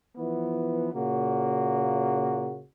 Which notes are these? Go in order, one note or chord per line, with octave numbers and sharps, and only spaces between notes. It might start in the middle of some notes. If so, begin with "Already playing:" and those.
E3 F3 B3
A#2 C#3 A#3 F#4